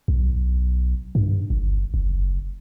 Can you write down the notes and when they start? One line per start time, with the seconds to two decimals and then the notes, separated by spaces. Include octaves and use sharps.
0.08 B1
1.15 G2
1.50 G1
1.94 F#1